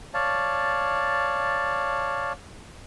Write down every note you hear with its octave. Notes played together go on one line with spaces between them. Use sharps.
C#5 D5 F5 A5